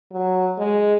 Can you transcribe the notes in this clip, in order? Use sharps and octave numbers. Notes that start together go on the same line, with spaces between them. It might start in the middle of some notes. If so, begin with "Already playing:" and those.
F#3
G#3